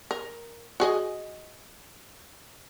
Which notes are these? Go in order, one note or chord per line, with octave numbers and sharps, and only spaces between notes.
A#4
F#4 G#4 D#5